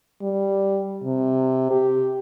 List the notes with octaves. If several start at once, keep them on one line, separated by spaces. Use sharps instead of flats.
G3
C3
G4